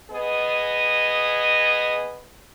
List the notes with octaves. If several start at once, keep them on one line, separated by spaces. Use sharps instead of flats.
B3 G#4 D#5